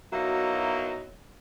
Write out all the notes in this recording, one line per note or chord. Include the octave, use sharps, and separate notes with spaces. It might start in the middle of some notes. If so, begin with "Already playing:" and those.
B2 F#3 A#3 D#4 E4 E5